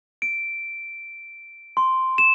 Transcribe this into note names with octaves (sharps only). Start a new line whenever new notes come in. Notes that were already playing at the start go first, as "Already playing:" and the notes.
D7
C6
E7